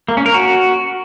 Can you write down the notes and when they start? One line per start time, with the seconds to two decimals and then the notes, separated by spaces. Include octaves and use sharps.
0.09 A#3
0.17 C#4
0.26 A#4
0.34 F#4